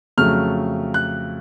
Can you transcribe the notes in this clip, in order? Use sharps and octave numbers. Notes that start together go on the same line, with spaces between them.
F2 C#3 F#3 A3 F6
F#6